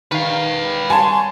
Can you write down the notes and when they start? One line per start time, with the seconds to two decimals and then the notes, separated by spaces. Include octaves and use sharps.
0.11 D#3 B4 F5
0.90 G3 C#5 G#5 A5 C6